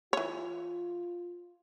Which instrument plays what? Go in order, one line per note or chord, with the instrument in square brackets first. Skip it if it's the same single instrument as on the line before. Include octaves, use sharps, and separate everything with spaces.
[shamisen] E3 C#5 [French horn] F4